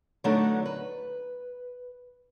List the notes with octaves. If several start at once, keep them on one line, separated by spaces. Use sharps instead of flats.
D3 F#3 A3 B3 D4 D#4
B4